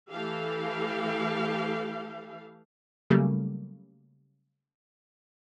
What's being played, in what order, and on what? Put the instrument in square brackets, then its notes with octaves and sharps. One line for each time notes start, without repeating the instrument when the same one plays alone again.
[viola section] E3 A3 G4 A4 F5
[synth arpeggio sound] C#3 F#3 G3 A3 A#3